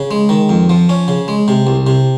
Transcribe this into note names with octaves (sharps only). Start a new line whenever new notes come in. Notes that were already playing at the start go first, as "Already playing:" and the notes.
Already playing: C#3
G#3
D#3
F2
F3
C#4
C#3
G#3
C3
C2
C3